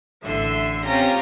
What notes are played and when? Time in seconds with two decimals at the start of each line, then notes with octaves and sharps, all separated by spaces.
0.23 A1 D3 E5 C6 E6
0.84 C4 C#4 F4 G4 A#5